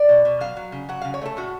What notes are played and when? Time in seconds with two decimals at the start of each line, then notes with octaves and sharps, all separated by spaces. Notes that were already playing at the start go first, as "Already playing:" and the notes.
Already playing: D5
0.09 B2
0.25 B2
0.41 F#3 F5
0.57 F#3
0.72 C#3
0.89 F#3 F#5
1.01 C#3 F5
1.14 C#5
1.22 A3 A4
1.37 A2 F#4